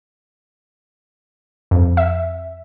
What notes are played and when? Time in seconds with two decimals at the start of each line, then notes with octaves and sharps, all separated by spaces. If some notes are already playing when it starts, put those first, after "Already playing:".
1.71 F2
1.97 E5